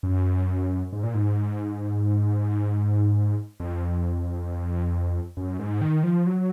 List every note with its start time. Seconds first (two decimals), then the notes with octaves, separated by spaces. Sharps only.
0.03 F#2
0.93 G#2
1.03 A#2
1.14 G#2
3.60 F2
5.37 F#2
5.59 G#2
5.81 D#3
6.03 F3
6.27 F#3